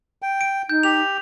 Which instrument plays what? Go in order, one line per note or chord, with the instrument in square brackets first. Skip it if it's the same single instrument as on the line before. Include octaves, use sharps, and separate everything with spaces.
[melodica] G5
[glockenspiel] D7
[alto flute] D#4 [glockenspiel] G6
[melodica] G4 [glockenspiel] F7